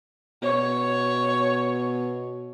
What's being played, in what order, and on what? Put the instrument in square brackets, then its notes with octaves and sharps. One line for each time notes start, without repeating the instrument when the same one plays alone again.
[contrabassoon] B2 [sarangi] C#5